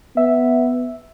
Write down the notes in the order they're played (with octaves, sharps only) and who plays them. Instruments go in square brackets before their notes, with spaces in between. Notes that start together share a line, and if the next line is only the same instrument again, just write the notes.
[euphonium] B3 [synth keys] E5